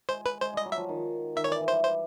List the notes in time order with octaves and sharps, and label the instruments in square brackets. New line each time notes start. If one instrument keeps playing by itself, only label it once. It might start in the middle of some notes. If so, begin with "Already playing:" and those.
[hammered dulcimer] G#3 [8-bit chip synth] C5
[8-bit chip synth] B4
[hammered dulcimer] G#3 [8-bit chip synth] C5
[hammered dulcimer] G3 [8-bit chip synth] D#5
[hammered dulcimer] F#3
[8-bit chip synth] E5
[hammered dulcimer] F3
D#3
[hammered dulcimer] D#3 [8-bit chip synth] E5
[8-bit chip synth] C#5
[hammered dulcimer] E3 [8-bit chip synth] D5
[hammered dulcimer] E3
[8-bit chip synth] C5
[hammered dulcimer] G3
[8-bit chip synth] C5